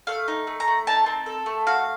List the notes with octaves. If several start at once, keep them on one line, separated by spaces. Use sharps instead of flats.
A3 F5
D#4
A3
A#5
A3
D#4 A5
C4
A4
A3
F#4 F5